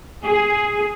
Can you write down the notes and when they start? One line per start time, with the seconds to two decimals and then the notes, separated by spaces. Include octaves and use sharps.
0.23 G#4